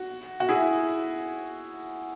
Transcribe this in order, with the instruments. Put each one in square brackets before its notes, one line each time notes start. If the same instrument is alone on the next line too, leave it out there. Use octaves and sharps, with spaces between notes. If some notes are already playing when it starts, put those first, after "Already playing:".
Already playing: [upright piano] F#4
F#4
E4 G#4